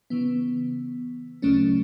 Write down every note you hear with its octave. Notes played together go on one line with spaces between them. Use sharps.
C#3 E3 B3
D2 C#3 F#3 A3 C#4